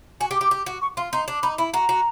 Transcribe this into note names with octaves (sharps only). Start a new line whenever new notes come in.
F#4 G#5
G4
D6
G4
G4
F#4
C#6
F4 C6
D#4 C6
D4
D#4 B5
E4 B5
F#4 A#5
F#4